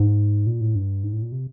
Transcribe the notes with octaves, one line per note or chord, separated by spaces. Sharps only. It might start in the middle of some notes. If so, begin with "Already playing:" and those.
Already playing: G#2
A#2
A2
G2
G#2
A2
A#2
C3